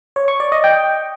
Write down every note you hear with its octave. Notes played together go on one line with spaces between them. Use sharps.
C#5
C#6
D5
D#5
G5